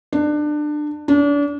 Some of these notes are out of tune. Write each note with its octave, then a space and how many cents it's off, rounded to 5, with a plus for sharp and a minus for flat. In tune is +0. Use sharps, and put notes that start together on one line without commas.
D4 +25
D4 -35